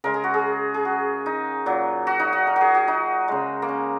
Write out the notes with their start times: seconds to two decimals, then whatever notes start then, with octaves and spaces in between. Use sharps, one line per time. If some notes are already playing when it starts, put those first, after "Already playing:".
0.04 C#3 G#3 A#4
0.14 G#4
0.24 F#4
0.34 G#4
0.74 G#4
0.85 F#4
1.26 D#4
1.66 A#2 F#3
2.07 F#4
2.19 D#4
2.33 F#4
2.47 A#4
2.56 F#4 G#4
2.75 F#4
2.88 D#4
3.28 C#3 G#3
3.62 A#3
3.69 C#4